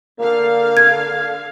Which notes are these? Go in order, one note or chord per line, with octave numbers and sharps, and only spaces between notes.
D3 A#3 F5
G#6